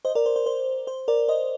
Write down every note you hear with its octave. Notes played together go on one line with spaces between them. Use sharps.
C5 D#5
A#4 D5
C5
C5
C5
C5
A#4 D5
C5 D#5